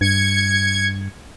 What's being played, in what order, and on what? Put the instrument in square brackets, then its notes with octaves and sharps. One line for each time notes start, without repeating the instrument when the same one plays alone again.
[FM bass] G2 [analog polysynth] G#6 C#7